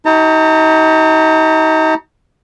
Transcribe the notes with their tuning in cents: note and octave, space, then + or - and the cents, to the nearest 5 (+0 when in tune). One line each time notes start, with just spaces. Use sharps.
D#4 +35 G4 -45 A#5 -40